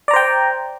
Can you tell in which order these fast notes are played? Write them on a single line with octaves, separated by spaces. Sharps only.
D5 A#5 C5 G5